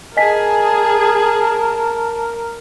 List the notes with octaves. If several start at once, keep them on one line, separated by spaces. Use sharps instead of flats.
G#4 A#4 D#5 G#5 A5 B6